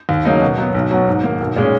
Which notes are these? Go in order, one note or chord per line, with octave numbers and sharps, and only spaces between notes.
D#2
C#3 F#3 A#3 D#4
B2
F#3 B3 F#4
B1
B2 F#3
G#2
D#3 A#3
B1
A#2 G#3 C#4